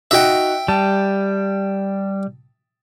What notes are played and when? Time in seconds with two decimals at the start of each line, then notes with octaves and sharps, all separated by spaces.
0.11 D#4 F#4 E5 G5
0.68 G3 A5